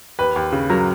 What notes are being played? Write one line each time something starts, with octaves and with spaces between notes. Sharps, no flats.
D#2 B4
D#2
C#3
F#3 A#4